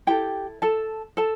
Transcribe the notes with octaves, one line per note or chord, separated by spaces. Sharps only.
E4 G4 A4 G5
A4 A5
A4 A5